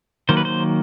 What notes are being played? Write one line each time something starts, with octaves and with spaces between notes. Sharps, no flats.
D#3 F#3 A#3 C5
B4
C5